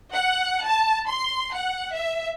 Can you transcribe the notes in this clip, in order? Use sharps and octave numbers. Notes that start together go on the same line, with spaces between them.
F#5
A5
C6
F#5
E5